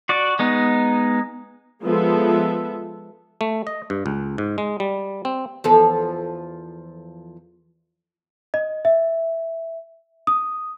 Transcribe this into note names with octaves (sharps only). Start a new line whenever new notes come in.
F#4 D5
G#3 B3 D#4
F3 G#3 B3 A4 E5
A3
D#5
G2
C#2
G#2
G#3
G3
C4
E2 F3 A4
D#5
E5
D#6